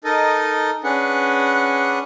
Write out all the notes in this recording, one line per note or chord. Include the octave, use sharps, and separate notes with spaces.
D#4 A4 A#4 D#5
C#4 D4 G#4 B4 F#5